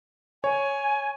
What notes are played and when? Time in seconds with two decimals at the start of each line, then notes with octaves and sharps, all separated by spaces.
0.44 C#5 G#5